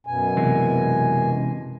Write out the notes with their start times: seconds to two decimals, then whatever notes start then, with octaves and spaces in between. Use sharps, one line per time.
0.07 F#2 B2 G#5
0.37 C3 E3 G#3